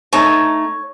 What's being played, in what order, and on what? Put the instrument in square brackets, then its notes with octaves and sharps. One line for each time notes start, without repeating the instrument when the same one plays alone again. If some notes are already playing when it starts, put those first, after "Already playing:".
[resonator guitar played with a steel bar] A3 D#4 A5 [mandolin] C#5